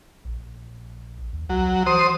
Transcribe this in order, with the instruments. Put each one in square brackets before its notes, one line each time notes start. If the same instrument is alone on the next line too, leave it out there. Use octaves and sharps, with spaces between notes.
[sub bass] A#1
D#2
[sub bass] C2 [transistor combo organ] F#3
[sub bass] E3 [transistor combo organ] C5 D#6